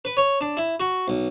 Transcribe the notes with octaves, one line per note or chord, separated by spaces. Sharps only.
B4
C#5
D4
E4
F#4
B1